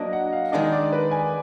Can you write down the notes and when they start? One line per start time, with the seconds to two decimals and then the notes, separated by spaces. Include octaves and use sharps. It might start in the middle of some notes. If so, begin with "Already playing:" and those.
Already playing: F#3 A#3 D4 D#5
0.13 F#5
0.33 F5
0.52 D#3 G#3 D4 G#4 D#5
0.72 D5
0.93 B4
1.11 G#5